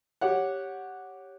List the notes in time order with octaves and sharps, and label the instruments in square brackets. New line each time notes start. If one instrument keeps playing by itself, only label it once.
[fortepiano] G4 C#5 F#5